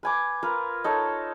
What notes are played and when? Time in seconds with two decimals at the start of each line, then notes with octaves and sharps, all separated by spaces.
0.03 B4 G#5 D6
0.43 F4 A#4 B4
0.84 D#4 A4 C#5